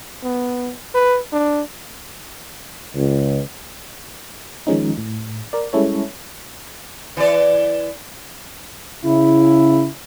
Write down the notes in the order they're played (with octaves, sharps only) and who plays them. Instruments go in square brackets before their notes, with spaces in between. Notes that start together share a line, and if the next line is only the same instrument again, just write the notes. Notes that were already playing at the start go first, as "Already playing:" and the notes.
[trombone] B3
B4
D4
[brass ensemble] C#2
[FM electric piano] D#3 F3 G#3 C#4 D#4
A2
A#4 D5
G3 G#3 C#4 E4 A4 C#5
[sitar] E3 D5
[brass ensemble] C#3 E4